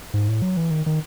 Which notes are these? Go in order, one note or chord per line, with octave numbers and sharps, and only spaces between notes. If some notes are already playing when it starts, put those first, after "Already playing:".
G#2
A2
F#3
E3
D#3
D#3